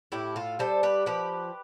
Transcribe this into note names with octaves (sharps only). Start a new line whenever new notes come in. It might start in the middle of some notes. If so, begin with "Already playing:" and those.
A2 E4 G4
F4 A4
G3 A4 C5
G4 B4
F3 G4 B4